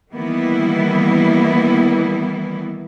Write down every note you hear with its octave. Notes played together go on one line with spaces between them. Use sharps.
D#3 E3 G3 A#3 B3 E4